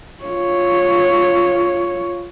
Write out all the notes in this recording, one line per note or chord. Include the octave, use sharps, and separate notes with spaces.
F4 C#5